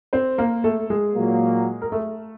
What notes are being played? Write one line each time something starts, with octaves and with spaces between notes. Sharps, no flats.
C4 C5
A#3 A#4
A3 A4
G#3 G#4
A#2 F#3 A#3
A#4
A3 A4